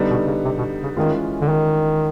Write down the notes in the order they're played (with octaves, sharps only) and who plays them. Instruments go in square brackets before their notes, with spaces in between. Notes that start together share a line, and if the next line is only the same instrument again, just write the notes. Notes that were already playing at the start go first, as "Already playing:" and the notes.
Already playing: [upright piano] D3 G3 B3 D#4
[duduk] B2
C#3
C3
B2
C#3
[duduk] D#3 [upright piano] E3 G#3 C#4 F4
[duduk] D3
D#3